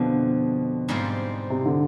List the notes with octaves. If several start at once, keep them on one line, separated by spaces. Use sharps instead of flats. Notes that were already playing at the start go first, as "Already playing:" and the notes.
Already playing: F2 B2 D3 F3
G#2 G3 C4 F4
C3
D3